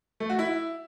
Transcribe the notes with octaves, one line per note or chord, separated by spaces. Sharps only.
A3
F#4
E4